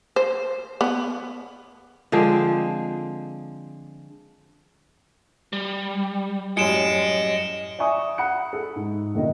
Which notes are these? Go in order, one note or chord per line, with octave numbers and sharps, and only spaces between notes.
C5
B3
D3 F3 G#3 C4
G3
F#2 A2 G3 D#5 G#5 C#7 D7 E7
D5 E5 G#5 C#6 D#6
F#5 B5 D#6 F#6 C#7
A4
G#2
F#1 A#2 D3 D#3 D#5